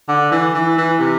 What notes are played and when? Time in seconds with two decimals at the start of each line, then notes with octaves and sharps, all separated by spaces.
0.09 D3
0.32 E3
0.54 E3
0.78 E3
1.00 C3